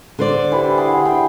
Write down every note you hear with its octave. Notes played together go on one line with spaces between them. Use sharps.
D3 C5 D5
E3 E4 G4
G#4 F#5 C6
G5 G#5